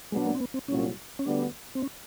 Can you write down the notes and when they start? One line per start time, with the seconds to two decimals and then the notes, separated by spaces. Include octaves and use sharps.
0.12 B2 F#3 G#3 B3 D4 F#4
0.26 A#3
0.35 C4
0.40 B3
0.54 C4
0.68 C2 A#2 F#3 C#4
1.19 C#4
1.25 D2 D3 G3 B3 D4
1.75 C4
1.82 C#4